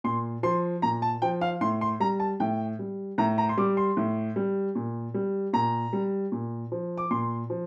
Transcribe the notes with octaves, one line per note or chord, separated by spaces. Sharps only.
A#2 C6
F3 C6
A#2 A#5
A5
F3 G5
F5
A2 C6
C6
G3 A#5
A5
A2 G5
G3
A2 A#5
A#5
C6
G3 D6
C6
A2
G3
A#2
G3
A#2 A#5
G3
A#2
F3
D6
A#2 C6
F3